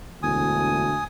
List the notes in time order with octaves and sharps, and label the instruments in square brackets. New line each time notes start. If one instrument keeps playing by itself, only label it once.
[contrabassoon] E1 [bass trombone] D2 [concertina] G#5 D#6